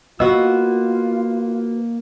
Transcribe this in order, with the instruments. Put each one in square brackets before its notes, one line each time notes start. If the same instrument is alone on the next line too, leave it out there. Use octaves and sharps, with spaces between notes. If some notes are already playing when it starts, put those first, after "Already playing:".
[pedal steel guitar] A#3 F5 E6 [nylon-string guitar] B3 F#4 [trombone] F4 [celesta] D#5